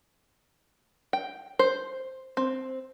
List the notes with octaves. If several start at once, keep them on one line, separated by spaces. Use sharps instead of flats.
G5
C5
C4